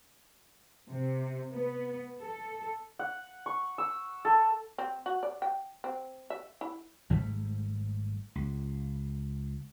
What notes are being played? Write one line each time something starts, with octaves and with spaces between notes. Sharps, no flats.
C3
B3
A4
F#5
C#6
E6
A4
C4
F#4
D5
G5
C4
E5
E4
G#1 G#2 G3 A3
C#2